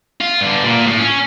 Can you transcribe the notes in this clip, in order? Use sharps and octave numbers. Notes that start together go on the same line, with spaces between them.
F4
G2 D3
A#2
A2
C#4